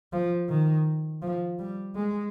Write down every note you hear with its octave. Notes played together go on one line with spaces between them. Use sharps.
F3
D#3
F3
G3
G#3